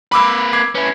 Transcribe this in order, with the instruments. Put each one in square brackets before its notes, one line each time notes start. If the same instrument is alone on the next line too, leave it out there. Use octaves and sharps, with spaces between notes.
[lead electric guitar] A#3 B4 [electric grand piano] B5 D6 E6
[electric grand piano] D6 G#6 C7
[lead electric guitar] C#4 E4 [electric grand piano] B4